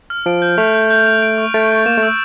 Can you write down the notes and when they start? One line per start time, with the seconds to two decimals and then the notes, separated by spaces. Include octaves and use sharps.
0.10 F6
0.26 F3 D7
0.42 G6
0.58 A3 F7
0.74 G6
0.90 G6
1.06 F7
1.22 D7
1.38 C#6
1.54 A3 A6
1.71 G7
1.86 A#3 E7
1.97 A3
2.03 E6